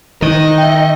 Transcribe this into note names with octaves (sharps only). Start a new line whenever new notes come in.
D#3 D#4 C5 D#5
E5 G5